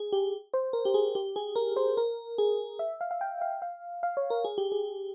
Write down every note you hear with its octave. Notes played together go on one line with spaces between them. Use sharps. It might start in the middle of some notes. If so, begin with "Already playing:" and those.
Already playing: G#4
G4
C5
A#4
G4
G#4
G4
G#4
A#4
C5
A#4
G#4
E5
F5
F5
G5
F5
F5
F5
C#5
A#4
G#4
G4
G#4